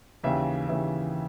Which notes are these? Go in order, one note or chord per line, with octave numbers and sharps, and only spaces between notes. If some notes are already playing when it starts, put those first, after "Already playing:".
D#2 C#3 E3 E5
D#2 C#3 E3 E5